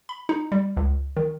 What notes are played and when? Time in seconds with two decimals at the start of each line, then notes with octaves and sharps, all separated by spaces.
0.09 B5
0.29 D#4
0.52 G3
0.77 C#2
1.16 D#3